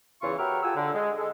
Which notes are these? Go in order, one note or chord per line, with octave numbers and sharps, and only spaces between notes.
E2 C#3 E3 F4 C#6
F#4 G4 A#4 B4 C#5 E5
F4 G4 A4 F#5 G#5 E6
D3
G#3
G#3 A4